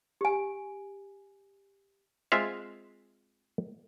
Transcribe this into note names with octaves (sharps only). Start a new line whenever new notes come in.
G4 G#5
G#3 C4 F4 E5 F5